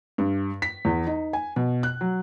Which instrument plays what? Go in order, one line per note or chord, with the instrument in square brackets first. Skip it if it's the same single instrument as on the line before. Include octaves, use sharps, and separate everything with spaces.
[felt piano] G2
B6
E2
D#4
G#5
B2
F#6
F#3